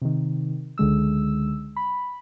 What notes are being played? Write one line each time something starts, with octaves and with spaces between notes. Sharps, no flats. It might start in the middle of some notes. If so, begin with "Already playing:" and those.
C3 D#3
C#2 D3 G#3 E6
B5